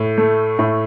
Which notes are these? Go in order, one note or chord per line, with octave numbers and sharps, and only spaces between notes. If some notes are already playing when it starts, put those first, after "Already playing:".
Already playing: A2
A3
A2